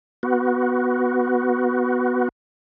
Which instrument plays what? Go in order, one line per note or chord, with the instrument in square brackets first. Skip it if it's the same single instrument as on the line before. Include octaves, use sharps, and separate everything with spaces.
[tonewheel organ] B3 F#4